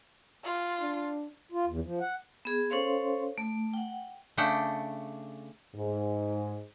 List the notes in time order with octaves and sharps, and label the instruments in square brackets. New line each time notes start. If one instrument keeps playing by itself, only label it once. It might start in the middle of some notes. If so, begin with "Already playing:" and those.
[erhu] F4
[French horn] D4
[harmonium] F4
E2
F3
F#5
[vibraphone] B3 G#4
C#4 A4 C5 C#5 F5 C6
A3
F#5 G5
[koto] C#3 A3 D4 F#5 G5
[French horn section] G#2